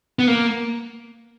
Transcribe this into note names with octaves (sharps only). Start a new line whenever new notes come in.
B3
A#3